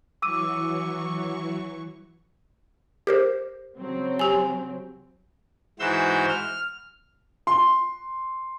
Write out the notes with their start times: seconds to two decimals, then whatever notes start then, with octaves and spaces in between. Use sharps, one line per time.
0.22 E3 F#3 C#6 D6 E6 D#7
3.07 G4 A#4 C5
3.76 C#3 F#3 C4
4.19 G4 G#5
5.80 G#2 E3 F#4 C5 E6 G6
6.28 F6
7.47 C6